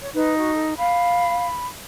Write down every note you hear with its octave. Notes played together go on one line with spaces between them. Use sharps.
C#5
D#4 B4
F#4
A4
F5 B5